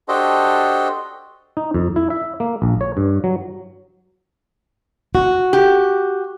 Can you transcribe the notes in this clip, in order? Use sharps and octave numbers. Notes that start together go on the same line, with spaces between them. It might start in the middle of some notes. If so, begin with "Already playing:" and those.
D4 F#4 G4 A4 C5 D#5
D#4
F2
E4
E5
A#3
A#1
C#5
G2
F#3
F#4
G4